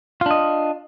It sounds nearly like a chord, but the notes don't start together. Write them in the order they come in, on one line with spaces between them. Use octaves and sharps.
F4 D4 D#5